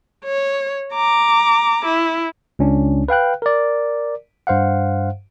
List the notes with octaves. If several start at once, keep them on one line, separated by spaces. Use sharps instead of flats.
C#5
A#5 D6
E4
C#2 C#4 D4
B4 F5 G5 F#6
A#4 D5
G2 C5 F5 F#5